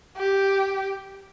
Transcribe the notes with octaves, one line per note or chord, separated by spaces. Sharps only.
G4